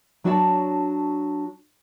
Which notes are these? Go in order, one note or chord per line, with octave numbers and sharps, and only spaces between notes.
F#3 D4 F#4 C#5 D5 A5